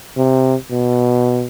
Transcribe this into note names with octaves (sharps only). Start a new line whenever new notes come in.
C3
B2